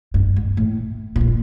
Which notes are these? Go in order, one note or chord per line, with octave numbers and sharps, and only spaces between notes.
G2
G#2
A2
B2
A#2